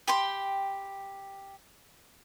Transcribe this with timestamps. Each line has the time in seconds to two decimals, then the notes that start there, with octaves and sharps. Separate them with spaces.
0.07 G4 G5 B5 C6